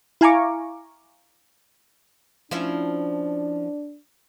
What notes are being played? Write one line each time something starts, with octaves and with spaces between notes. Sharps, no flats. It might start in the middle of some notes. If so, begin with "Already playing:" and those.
E4 F5 G#5 A#5 C#6 D6
F3 C#4 D4 E4